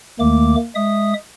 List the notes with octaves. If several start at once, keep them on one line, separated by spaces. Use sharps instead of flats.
D#2 D#3 A3 A#3 D6
G#3 E5 D#6